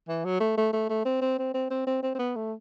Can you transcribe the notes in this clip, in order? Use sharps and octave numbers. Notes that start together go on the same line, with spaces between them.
E3
F#3
A3
A3
A3
A3
C4
C4
C4
C4
C4
C4
C4
C4
B3
A3